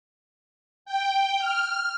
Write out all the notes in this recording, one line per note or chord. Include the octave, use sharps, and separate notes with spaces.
G5
F6